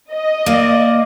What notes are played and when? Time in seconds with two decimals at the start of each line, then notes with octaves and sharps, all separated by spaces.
0.13 D#5
0.46 A#3 D5